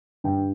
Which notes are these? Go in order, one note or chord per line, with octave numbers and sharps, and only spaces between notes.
G2 G5